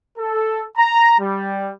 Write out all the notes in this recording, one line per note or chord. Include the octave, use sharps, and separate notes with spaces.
A4
A#5
G3